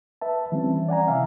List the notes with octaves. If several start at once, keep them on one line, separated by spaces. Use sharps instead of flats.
B4 E5 A5
E3 G3 C4 C#4
D5 F#5 G#5 A#5
C3 E3 E5 F5